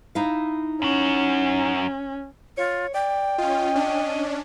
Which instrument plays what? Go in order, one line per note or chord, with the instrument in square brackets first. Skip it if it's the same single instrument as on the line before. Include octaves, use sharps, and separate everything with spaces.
[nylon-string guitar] D#4 E4 F5
[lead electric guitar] F#2 F#4 [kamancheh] C#4
[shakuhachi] F4 [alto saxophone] C#5
[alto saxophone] D5 [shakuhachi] G5
[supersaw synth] C#4 F4 [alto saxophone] D#5
[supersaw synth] C#4 D4